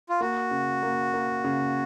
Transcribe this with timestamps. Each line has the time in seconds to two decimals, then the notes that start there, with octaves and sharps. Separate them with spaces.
0.09 F4
0.20 A#3 F#4
0.51 C#3
0.83 A#3
1.14 A#3
1.44 C#3